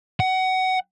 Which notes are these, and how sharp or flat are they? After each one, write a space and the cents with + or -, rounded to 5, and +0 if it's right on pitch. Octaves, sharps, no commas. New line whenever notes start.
F#5 +20